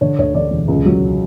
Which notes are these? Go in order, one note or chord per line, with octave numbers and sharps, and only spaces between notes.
D3 C#5
D2 C#5
D3 D5
E1
C#2
F#3